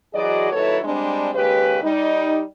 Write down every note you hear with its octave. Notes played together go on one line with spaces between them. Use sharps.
E3 F#3 F#4 G#4 D5 D#5
D#2 F#3 E4 A4 B4 C#5
G3 G#3 C4 D4
D#2 C#3 G#3 G4 B4
G3 D#4